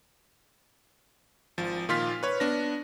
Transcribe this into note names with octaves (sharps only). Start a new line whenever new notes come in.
G#1 F3
A#2 D#3 F4 C6 F6 B6
B4 C#5
B3 D4 A#6